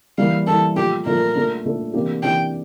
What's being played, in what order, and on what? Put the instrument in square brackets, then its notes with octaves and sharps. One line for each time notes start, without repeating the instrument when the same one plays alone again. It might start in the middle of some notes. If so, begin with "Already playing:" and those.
[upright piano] E3 G3 A#3 [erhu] F5
[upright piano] E3 G3 A#3 [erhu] A4
[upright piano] A#2 F3 A3 [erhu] G4
[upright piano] A#2 F3 A3 [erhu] A#4
[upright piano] A#2 A3 D4
A#2 A3 D4
C3 E3 A#3 D4 G4
[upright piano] C3 E3 A#3 D4 G4 [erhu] G5